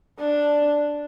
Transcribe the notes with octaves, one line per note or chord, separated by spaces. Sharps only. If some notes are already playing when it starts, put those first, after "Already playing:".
D4